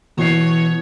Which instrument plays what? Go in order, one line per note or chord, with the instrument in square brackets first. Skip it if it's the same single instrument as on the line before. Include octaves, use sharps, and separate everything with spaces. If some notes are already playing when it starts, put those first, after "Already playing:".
[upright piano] B2 C7 [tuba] E3 [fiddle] C#5